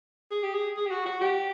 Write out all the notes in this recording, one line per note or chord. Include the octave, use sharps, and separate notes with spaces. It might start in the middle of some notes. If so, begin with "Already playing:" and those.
G#4
G4
G#4
G#4
G4
F#4
F#4
G4